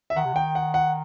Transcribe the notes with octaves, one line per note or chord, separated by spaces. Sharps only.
E5
D#3 F#5
C3
D#3 G5
F#5
F#5